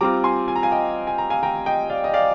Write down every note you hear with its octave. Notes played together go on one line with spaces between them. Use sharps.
G3 C4 F4 A#5 D6
G#5 C6
G#5
A#5
F5 G#5
D#5 G5
G#5
A#5
F5 G#5
G5 A#5
D#5 G5
D5 F5
D#5
D5 F5